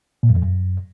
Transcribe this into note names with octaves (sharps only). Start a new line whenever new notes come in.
A#2
F#2
F2
F#2